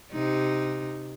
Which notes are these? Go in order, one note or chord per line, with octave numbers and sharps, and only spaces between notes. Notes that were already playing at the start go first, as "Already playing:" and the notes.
C3 D#4